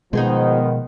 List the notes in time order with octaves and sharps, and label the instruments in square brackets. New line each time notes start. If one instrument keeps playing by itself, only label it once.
[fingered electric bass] B2 G#3 [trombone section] D#3 F3 [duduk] B3 [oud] D#4 G#4 C5